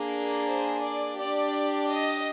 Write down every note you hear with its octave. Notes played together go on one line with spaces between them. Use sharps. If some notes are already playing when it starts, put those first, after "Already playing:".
Already playing: A#3 D4 G#4
C5
D5
D4 G4 D5
D#5